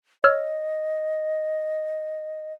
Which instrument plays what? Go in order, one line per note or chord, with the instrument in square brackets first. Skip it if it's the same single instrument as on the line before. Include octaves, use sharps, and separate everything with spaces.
[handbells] C#5 E6 F6 [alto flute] D#5